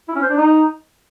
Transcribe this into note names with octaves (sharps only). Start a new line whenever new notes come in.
E4
C#4
C5
D4
D#4